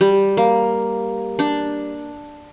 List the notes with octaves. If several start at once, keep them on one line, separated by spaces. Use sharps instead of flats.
G3
A#3
D4